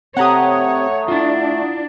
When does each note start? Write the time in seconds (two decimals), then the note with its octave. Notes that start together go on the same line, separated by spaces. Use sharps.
0.17 A3 C4 G4 C#5 F#5 A#5 D#6
1.08 D4 E4 F4